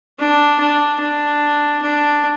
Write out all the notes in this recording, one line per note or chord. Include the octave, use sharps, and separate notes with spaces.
D4
D4
D4
D4